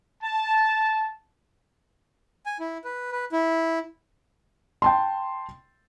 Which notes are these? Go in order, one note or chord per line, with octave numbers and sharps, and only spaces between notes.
A5
G#5
E4
B4
B4
E4
G5 A5 C6